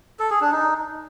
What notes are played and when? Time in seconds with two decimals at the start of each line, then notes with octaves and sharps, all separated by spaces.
0.19 A4
0.30 G#4
0.41 D4
0.52 D#4